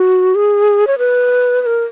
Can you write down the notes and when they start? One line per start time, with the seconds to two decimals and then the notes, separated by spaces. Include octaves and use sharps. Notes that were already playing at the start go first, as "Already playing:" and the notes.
Already playing: F#4
0.35 G#4
0.87 C#5
0.98 B4
1.62 B4
1.66 A#4